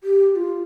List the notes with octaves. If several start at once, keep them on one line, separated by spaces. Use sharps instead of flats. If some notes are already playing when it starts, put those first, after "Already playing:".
G4
G4
F4